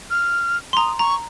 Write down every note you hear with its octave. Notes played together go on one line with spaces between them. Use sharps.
F6
C6
A#5 D#6
A#5 C#6